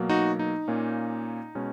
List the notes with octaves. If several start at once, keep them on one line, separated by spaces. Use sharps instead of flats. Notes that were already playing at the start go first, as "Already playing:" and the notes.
Already playing: B2 F#3 A#3
D#4 F#4
D#4
A#2 A#3 C#4
B2 G#3 C#4